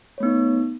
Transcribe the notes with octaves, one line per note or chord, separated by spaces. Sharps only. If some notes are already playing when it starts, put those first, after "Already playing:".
A3 B3 D#4 C#5